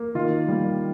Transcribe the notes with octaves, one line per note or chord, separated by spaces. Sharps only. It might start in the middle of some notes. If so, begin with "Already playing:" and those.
Already playing: A#3
D#3 F4
G3